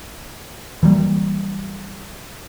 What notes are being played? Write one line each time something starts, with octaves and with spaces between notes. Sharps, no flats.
E3 F#3 G3 A#3